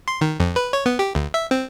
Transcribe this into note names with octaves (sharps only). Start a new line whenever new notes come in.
C6
D#3
F2
B4
C#5
B3
G4
D2
E5
C4